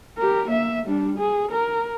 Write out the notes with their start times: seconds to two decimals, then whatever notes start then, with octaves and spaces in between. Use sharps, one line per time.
0.18 G4 A#4
0.48 A#3 E5
0.86 G3 D4
1.18 G#4
1.52 A#4